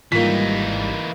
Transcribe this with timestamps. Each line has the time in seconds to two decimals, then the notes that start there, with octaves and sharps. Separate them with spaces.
0.12 G#1 G#2 E3 G3 A#3 D#4 F4 B6